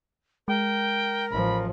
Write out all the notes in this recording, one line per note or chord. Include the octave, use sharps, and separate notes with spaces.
G#3 A#4 G5
A1 F3 B5